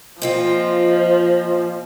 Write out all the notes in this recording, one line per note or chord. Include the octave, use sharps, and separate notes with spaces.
A#2 F3 C4 F4 C5 D#5